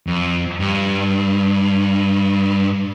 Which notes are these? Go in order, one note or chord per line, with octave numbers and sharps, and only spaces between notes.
F2
G2